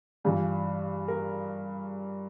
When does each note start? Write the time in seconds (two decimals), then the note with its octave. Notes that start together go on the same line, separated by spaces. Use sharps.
0.24 G2 E3 F4
1.08 A#4